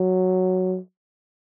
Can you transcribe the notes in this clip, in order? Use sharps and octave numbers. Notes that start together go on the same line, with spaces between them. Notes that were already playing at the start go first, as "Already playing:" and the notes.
Already playing: F#3